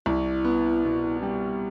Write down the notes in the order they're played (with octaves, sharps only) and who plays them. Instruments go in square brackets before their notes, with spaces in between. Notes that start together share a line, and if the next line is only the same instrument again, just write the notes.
[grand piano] C2 [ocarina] E4
[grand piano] B3
B2
G3